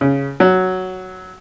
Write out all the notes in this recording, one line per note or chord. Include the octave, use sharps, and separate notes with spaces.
C#3
F#3